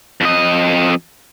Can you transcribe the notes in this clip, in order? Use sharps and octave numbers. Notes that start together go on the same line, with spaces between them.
F2 D#5